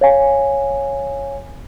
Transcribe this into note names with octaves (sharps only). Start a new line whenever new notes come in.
C#5 F5 G#5